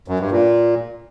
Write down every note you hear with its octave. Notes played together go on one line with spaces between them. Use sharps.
F#2
G2
A#2